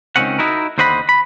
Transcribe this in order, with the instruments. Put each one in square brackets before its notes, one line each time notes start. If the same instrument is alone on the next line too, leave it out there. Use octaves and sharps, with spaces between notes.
[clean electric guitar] C#2 D#3 G#3 C4 C#4 F#5
D#4 E4 F#4 A#4
D#2 D3 C5 D#5 F#5 B5
B5